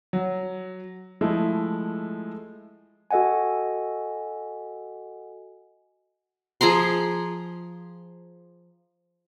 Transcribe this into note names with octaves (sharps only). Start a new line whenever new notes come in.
F#3
F3 G#3 A3 E4
F#4 A4 D#5 F#5 G#5
F3 G#4 A#5 C6